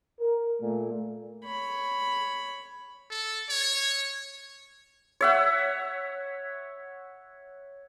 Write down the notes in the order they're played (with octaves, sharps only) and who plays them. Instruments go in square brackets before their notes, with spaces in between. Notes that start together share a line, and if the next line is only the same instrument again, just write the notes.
[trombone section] A#4
A#2 A3
[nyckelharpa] C#5 B5
[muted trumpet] A4
C#5
[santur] C#5 E5 F#5